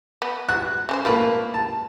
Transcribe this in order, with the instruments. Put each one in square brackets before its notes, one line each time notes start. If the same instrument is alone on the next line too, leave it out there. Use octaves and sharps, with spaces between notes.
[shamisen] B3
[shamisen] F#4 [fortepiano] F#6
[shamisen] C#3 C#4 C5
[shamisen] A3 F4 B4 [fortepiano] A#3 A#4
[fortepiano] A5